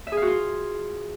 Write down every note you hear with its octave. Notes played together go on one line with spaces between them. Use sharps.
E5
G#4
F5
F#4
F4